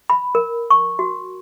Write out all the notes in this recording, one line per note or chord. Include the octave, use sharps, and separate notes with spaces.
B5
A#4
C#6
F#4